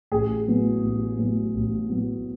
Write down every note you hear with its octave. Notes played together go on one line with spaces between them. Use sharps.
A1 G#4
A2 F#3 B3
A1
A2 F#3 B3
A1
A2 F#3 B3